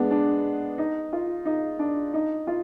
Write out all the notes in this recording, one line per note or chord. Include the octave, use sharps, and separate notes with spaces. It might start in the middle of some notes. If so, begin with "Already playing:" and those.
Already playing: G#3 B3 D4
D4
D#4
F4
D#4
D4
D#4
F4